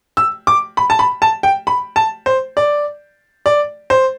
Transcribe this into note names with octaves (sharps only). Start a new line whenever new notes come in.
E6
D6
B5
A5
B5
A5
G5
B5
A5
C5
D5
D5
C5